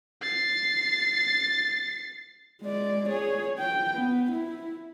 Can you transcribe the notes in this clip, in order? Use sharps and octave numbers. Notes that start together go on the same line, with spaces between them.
A6 C7
G#3 D5
G#4 C#5
G5
B3
E4